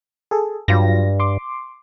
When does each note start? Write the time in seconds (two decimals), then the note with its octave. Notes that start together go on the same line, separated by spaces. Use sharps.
0.31 G#4 A4
0.68 G2 F#3 F4 A#6
1.20 C6 D6